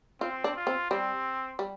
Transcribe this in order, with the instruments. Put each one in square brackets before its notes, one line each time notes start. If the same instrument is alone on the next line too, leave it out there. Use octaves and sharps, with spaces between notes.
[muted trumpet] C4 [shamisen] F4
[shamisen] D4
[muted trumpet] F4
[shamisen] C4
[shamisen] G3 [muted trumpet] C4
[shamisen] G3